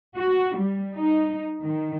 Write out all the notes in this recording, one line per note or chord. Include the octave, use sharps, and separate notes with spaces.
F#4
G3
D#4
D#3